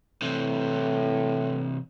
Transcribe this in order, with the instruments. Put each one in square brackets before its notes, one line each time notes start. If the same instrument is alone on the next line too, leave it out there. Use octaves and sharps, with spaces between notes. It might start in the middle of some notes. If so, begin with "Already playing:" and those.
[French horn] A2 [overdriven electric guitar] C3 E3